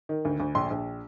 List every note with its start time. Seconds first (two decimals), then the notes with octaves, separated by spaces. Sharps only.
0.09 D#3
0.25 D2
0.40 D2
0.55 A#1 C6
0.70 A#1